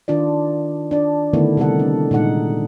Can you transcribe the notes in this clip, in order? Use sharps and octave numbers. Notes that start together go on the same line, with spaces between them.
D#3 D4 F4 D5
D4 D5
D3 D#3 A3 B3 E4
C3 G3 A4 F#5
D4
A#2 G#3 D#4 F#5